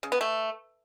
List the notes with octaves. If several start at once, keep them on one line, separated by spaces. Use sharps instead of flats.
C#3
B3
A3